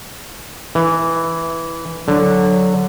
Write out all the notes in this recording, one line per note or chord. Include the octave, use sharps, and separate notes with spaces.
E3
D3 F#3